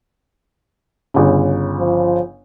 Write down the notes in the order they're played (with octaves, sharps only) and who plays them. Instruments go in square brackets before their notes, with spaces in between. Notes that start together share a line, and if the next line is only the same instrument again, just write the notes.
[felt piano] G1 C#3
[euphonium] F3